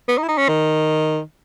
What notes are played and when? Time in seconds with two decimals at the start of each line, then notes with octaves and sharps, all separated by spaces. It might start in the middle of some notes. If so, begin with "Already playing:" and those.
0.09 B3
0.18 D#4
0.23 E4
0.29 D#4
0.38 C#4
0.49 D#3